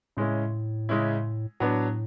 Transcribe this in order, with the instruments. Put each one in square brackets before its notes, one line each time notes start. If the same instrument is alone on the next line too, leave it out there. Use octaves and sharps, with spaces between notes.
[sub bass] A2 [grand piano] C#3 G#3 C#4 E4
[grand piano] C#3 G#3 C#4 E4
[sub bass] A2 [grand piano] F#3 B3 D4